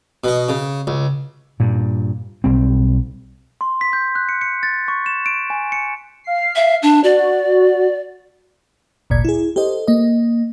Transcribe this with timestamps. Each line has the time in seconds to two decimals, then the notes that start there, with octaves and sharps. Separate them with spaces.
0.24 B2 D#5
0.49 C#3
0.87 C#2
1.60 G2 A#2
2.44 B1 G3 C4
3.61 C6
3.81 B6
3.93 G6
4.15 F#6
4.29 C#7
4.41 C#7
4.63 A6
4.88 C#6
5.06 E7
5.26 D7
5.50 G#5
5.72 C#7
6.24 F5 C7
6.56 E5
6.82 D4
7.04 F#4 D5
9.10 G#1 D2 A#2 D5 G#6
9.25 E4 G#4
9.56 G4 A4 C5 D#5
9.88 A#3 D#5